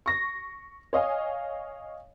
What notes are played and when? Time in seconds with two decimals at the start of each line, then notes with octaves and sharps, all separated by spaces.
0.06 C#6 A#6
0.93 C#5 D#5 F5 G#5